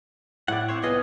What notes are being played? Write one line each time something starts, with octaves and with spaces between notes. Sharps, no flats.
A2 E4 D5 F#5
C4 C5 C#5
C2 B3 F4 G#4 D#5